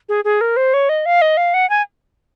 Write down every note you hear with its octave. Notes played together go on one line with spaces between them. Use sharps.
G#4
G#4
A#4
C5
C#5
D#5
F5
D#5
F5
F#5
G#5